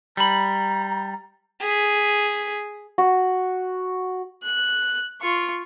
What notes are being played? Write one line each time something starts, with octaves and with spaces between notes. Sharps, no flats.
G3 A#5 B5
G#4 B6
F#4
F#6
F4 C#6